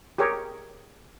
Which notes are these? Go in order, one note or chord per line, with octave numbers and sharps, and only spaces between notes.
G4 G#4 A#4 C#5